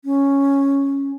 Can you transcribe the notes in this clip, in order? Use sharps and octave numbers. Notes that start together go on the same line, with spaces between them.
C#4